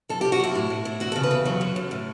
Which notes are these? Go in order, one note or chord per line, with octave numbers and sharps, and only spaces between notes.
F#2 A4
F#2 G4
F#4
F#2 E4
A2
A2
A2
E2 F#4
C#3 A4
B4
E2
F#3
F#2
F#2
A2